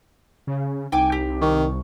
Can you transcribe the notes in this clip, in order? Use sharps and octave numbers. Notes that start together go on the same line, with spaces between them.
C#3
C2 D#4 G5 G#5 D6
G4
D#3 C#6